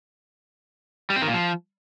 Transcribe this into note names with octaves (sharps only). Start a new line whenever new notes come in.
G3
C4
D#3
A#2
F3